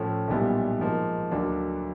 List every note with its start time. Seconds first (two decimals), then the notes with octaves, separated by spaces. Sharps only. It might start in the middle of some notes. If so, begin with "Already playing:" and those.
Already playing: A2 F3 A3 C#4
0.28 B1 A#2 G3 B3 E4
0.80 G#2 F3 A#3
1.31 D2 D3 F#3 A#3 D4